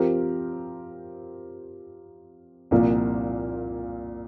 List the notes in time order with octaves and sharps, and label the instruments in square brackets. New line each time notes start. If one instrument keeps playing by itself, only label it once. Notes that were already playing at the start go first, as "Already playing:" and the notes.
Already playing: [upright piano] F3 C4 G4 A#4
C2 A#2 F3 A#3